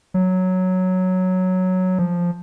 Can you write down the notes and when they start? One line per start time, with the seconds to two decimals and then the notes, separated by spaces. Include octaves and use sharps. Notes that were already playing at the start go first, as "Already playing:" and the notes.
0.14 F#3
1.98 F3